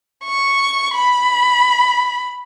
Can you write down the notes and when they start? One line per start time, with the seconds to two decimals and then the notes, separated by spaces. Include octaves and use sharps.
0.25 C#6
0.95 B5